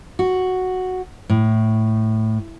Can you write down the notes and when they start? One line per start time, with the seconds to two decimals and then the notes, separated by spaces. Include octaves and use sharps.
0.19 F#4
1.29 A2